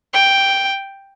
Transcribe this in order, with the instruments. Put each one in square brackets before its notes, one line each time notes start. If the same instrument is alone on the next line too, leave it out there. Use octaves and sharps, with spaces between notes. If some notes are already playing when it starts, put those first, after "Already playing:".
[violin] G5